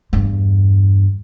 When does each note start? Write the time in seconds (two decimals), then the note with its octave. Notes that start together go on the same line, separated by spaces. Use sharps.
0.13 E2 G2